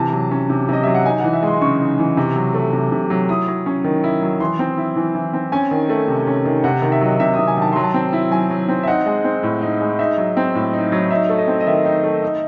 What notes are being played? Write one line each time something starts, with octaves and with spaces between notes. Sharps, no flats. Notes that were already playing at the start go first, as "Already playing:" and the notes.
Already playing: C3 E3 A5
F#3
C#4
C3
C3 D#5
F#3 E5
F#5
D#4 G#5
E3 F#5
E5
G#3 C6
C#3 C#6
D#4
E3
C3
F#3
A3
C3
C3
F#3
E4 D#6
F#3
C#4
D#3
E4
F#3
E3 C6
C4
E4
E3
E3
C4
C#4 G#5
D#3
A3
C3
C#4
D#3
C3 F#5
D#3
E5
F#3 D#5
C3 E5
D#6
C3
G#5
D#3 A5
F#3 C6
A5
C4
E4
F#3 G#5
F#3
C4
E5
D#4 F#5
G#3
C4
A2
D#4
G#3
D#4 E5
F#3
C4
A2
D#4
F#3
D#4 E5
A3
D#5
C4
D#5
D#3 E5
D#4
A3
D#4